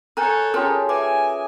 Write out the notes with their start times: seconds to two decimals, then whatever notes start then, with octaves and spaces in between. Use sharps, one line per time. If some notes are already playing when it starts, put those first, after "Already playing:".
0.17 A4 A#4 C#5 G#5 A#5 F#6 G6
0.54 C#4 F4 G4 G#4 A#4 A5 C6
0.89 B4 E5 G#5 D6